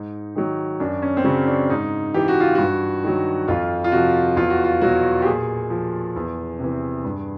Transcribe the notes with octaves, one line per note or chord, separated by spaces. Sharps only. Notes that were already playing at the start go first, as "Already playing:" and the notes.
Already playing: G#2 D#4
D#3 F#3
F#2 D4
C#4
C4
C#3 F#3 C#4
D4
G#2 D#4
E3 G4
F#4
F4
G2 F#4
D#3 F#3
F2 F4
F4
C3 F3 F#4
E2 F4
F#4
F4
B2 F#3 F#4
G4
A#2 G#4
F3
E2
C3 E3
G2